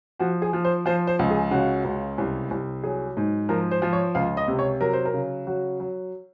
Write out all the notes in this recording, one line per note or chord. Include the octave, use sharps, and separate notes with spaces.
F3 F#4
G#4
F3
C5
F3 C5
C5
C#2
G#4
C#3 F#4
C#2
C2
C2
F#3 G#4
G#2
F3 A#4
C5
F3
C#5
C#2 F5
D#5
C3
C#5
F#3 A#4
C5
A#4
C#3
F#3 F#4
F#3